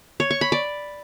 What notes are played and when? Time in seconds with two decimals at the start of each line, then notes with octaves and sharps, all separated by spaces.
0.20 C#5
0.31 C#6
0.41 B5
0.52 D5